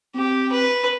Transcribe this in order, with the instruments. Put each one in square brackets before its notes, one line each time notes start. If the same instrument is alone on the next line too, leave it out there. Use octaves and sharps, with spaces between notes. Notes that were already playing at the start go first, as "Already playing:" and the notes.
[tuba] C4 [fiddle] G4
[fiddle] B4